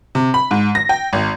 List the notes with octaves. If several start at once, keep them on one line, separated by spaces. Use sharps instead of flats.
C3
B5
G#2
A#6
G5
G#1